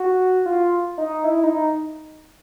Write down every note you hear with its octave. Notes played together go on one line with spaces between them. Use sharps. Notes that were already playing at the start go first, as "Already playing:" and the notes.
Already playing: F#4
F4
D#4
E4
D#4